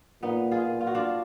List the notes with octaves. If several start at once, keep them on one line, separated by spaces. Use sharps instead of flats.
A#2 B3 D#4
F4 G#4
A#2
F4
F#4
D4 F4